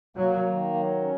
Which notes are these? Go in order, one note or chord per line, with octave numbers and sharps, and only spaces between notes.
F#3 A#3
D#3
F#3
C#4